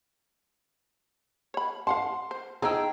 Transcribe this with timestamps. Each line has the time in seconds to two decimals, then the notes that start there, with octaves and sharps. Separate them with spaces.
1.54 C#5 B5
1.87 F5 F#5 A5 C6
2.31 C5
2.62 F3 D#4 G#4 C5 G5 A#5 E6